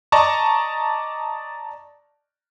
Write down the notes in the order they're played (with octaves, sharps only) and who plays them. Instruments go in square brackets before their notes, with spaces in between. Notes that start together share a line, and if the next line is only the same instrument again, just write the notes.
[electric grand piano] D5 D#5 A5 A#5 C#6